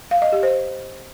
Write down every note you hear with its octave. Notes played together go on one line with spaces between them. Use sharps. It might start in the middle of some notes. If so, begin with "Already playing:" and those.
F5
D#5
G4
C5